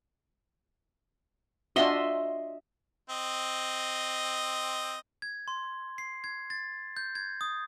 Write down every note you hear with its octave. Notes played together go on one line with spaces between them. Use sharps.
D4 F4 F#4 D#5 E5 C6
C4 D#5
G#6
C6
C7
G#6
A6
G6
G#6
D#6